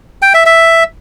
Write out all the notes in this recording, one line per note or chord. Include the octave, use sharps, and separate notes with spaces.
G5
E5
E5